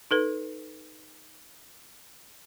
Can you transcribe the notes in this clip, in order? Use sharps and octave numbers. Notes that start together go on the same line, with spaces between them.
D#4 A4 B4